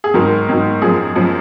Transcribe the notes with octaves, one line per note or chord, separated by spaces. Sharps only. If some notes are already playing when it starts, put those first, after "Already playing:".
G#4
G#2 D#3 F#3 A#4
G#2 D#3 F#3
F#2 F3 G#4
F#2 F3